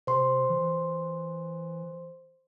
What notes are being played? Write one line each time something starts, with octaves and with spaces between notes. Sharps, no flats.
C3 C5 C6
E3